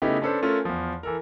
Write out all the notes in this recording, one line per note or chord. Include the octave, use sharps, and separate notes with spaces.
C#3 A3 B3 D#4 E4 G4
C#4 D4 A4 B4 C5
A3 C#4 F4 A4 A#4
E2 F3
E3 A4 A#4